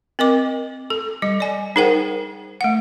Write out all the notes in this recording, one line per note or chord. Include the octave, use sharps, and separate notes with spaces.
C4 A#4 D#5 D6
A4
G3 D#5
D5 G#5
D#4 G#4 A#4 C5 F#5 G5
A3 F#5